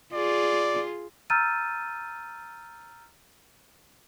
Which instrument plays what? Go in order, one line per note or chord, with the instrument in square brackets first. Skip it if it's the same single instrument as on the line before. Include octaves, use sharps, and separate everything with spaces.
[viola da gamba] F4 G#4 [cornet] D5
[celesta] A#5 E6 F6 G6 A6 D#7